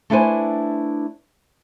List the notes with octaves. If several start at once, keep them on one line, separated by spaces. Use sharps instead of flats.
A3 D4 E4 B4 C5 G#5